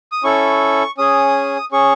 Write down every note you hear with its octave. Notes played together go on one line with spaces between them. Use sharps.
D#6
C#4 E4 A4 C#6
C#4 G#4 D#6
C#4 G#4 C#6